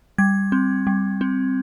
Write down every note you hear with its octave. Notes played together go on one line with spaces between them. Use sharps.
G3 G#6
C4
G3
C4